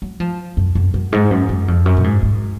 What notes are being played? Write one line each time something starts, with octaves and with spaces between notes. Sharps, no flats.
F#3
F3
F#2
F#2
F#2
G#2
F#2
F#2
F2
F#2
A#2
G#2
G#2